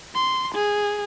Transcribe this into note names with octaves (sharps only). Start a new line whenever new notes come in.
C6
G#4